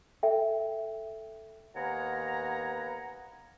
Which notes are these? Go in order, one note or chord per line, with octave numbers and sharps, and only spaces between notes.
A4 E5 G5
D#2 B3 F5 F#5 G#5 A#5